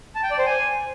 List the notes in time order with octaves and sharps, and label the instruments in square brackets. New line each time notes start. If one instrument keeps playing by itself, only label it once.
[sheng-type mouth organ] A5
G5
D5
C5
G#5